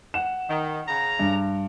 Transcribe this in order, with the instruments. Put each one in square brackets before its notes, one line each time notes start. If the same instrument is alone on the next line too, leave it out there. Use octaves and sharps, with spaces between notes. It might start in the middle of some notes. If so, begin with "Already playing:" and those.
[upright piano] F#5 E7
[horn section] D#3
C#3 C#4 A#5
[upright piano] G2